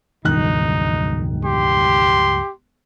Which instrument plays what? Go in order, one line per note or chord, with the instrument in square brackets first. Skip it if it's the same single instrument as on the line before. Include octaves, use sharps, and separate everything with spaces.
[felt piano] E1 D#3 F#6 [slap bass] C#2 G2 F3 [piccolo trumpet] D#4
[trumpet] G4 [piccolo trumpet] C6